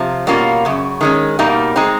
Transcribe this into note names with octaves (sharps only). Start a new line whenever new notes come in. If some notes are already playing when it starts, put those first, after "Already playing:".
Already playing: C3 F3
B2 G3 A#3 C#4 F4
F#2 C#3
D#3 G#3 C#4
B2 G3 A#3 D#4
G#3 C4 D#4